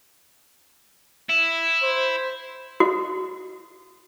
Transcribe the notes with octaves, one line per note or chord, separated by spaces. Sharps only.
E4
C5
F#4